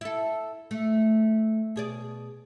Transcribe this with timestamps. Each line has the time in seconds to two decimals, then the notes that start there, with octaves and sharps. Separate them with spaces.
0.01 E4 A4
0.71 A3
1.76 B2 G#4 D5